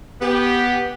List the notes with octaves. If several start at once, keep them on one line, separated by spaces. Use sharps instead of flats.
B3 G4